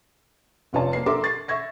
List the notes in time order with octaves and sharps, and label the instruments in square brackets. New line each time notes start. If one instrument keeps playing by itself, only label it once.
[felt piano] F1 G2 F4 C#5 D5 A5
A#3 C7
D4 A4 A#4 E5 C6 D6
C#6 A6 C7
E5 C#6 G#6 A#6